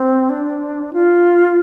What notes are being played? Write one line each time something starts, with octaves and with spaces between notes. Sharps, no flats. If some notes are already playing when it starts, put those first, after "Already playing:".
Already playing: C4
D4
F4